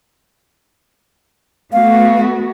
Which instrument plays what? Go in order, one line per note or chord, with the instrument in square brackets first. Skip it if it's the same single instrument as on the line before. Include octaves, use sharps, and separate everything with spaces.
[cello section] A3 B3 F#4 [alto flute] F5